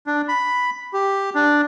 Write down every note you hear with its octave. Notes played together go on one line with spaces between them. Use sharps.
D4
B5
G4
D4